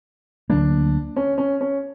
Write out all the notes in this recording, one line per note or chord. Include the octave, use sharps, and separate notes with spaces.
D2 D3 F#3 A#3 D4
C#4
C#4
C#4